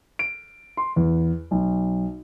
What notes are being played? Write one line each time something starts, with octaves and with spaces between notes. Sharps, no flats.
D7
C6
E2
B1